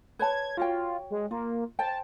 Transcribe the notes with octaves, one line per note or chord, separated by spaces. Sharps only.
B4 C#5 A5 G#6
F4 F#4 C#5 G5
G#3
A#3 F4
C5 G5 A5